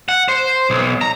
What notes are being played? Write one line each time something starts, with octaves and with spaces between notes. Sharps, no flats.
F#5
C5
B1
A#5